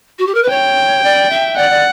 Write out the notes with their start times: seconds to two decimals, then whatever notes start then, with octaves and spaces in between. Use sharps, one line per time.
0.18 F#4
0.26 G4
0.34 A#4
0.42 B4
0.49 C#5 G5
1.03 D5
1.30 E5
1.56 D5 F#5
1.69 D5